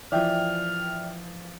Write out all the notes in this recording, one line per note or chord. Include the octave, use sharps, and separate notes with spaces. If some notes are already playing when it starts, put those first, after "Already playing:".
E3 F3 D5 E5 G5 F6